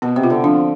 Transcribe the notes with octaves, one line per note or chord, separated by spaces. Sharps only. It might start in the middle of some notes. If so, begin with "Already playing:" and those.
B2 B3
C3
F4
D3
F3 D4